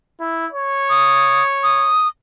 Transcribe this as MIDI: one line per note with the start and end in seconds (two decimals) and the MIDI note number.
0.20 0.47 64
0.52 1.97 73
0.90 1.43 87
1.63 2.07 87